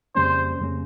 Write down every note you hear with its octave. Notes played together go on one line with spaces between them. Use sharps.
F2 C#3 G3 A#3 C#4 C5
F2 C#3 G3 A#3 C#4